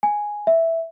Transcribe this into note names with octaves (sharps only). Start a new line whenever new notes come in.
G#5
E5